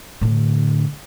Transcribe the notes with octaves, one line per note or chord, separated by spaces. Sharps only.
A2 D3